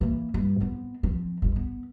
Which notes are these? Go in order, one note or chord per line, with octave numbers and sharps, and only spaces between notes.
E3 A#3
G2
B3 C4
F3 C4
G1 D2
B3